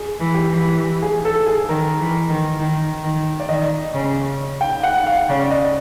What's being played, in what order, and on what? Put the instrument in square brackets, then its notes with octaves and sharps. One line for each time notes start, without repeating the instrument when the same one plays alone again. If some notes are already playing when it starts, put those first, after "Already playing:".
Already playing: [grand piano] G#4
[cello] E3
[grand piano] G4
[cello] E3
[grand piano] G#4
A4
G#4
[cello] D#3 [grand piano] A#4
[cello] E3
D#3
D#3
D#3
[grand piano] D5
[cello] D#3 [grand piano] D#5
[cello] C#3
[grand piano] G5
F#5
F5
[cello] C#3 [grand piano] D5
[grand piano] D5
D#5